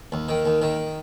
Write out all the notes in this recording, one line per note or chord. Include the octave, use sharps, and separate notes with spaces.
D#2
D#3
D#2
D#3